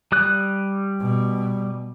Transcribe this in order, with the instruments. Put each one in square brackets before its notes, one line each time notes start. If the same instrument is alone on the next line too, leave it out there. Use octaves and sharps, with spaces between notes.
[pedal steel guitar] G3 D#6 F#6
[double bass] B2